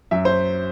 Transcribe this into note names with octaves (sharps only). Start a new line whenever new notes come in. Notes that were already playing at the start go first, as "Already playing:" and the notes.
F#2 E5
C5